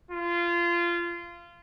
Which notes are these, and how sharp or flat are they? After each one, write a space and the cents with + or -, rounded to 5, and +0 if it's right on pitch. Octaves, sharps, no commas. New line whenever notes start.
F4 -20